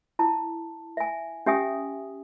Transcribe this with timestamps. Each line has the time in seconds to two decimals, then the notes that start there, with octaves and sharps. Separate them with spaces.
0.19 E4 A5
0.97 E5 G#5
1.46 C#4 G4 E5 G#5 D#6